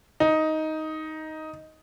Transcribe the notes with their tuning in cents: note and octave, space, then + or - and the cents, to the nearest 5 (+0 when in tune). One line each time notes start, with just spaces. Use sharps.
D#4 +10